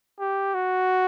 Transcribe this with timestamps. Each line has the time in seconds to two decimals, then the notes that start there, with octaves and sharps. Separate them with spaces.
0.19 G4
0.54 F#4